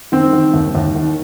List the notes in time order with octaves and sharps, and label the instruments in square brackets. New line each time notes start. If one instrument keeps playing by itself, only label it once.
[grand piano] D#3 C4
D#3
D#2
D#2
D#3